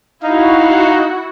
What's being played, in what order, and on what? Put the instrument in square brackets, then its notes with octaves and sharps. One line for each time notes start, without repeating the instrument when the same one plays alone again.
[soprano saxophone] D#4 [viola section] E4 F#4 [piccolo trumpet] F5